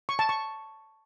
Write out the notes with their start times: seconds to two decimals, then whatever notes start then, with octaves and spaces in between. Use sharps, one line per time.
0.09 C#6
0.19 A5
0.29 C#6